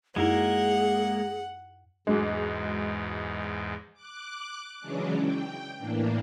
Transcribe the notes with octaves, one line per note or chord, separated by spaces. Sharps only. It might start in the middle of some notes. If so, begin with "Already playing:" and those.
F#2 G#3 A#3 D#4 E4 G#4 A#4 F#5
E2 G#2 F#3 G#3 D4 G#4
D6 F#6
C#3 E3 F#3 G#3 C#4 D4
G5
A2 E3 A#3 D4